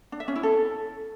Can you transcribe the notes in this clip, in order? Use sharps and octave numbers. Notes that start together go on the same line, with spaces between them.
D4
E5
C#4
E4
A4